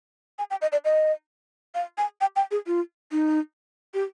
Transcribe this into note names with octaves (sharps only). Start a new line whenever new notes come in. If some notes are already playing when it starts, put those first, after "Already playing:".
G#5
G5
D#5
D5
D#5
F5
G#5
G5
G5
G#4
F4
D#4
G4